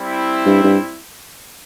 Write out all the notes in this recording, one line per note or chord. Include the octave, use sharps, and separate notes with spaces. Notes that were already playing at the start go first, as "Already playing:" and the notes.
Already playing: G3 C4 E4
G2
G2